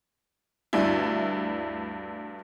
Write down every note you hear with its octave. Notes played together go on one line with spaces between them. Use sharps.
D2 G2 D4 E4